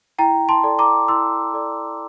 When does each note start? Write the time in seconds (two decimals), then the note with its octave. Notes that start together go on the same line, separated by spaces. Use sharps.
0.19 E4 G5 A#5
0.49 A5 C6
0.64 A4 D5
0.79 A#5 D6
1.08 E4 C6 E6
1.54 A4 D5